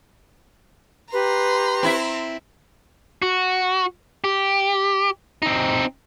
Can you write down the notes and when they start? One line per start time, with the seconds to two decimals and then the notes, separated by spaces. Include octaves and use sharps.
1.13 G4 B4 A#5 C6
1.83 C4 E4 E5
3.22 F#4
4.24 G4
5.42 C4 D#4